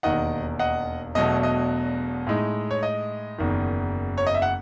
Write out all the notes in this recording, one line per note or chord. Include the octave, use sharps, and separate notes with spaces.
E1 D#2 D#3 D#5 F#5
D#5 F#5
E1 E2 B2 F#3 A3 D#5
D#5
A2 G#3 D#4
C#5
D#5
F#1 E2 D#3
C#5
D#5
E5
F#5